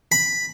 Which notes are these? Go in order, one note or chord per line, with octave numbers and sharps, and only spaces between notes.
B5